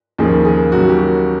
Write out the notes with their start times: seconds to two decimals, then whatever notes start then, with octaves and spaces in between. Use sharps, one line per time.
0.19 D#2 C#3 F3 A#3 G#4
0.45 G#4
0.72 D#2 C#3 F#3 A#3 F#4
0.89 G4
0.98 F#4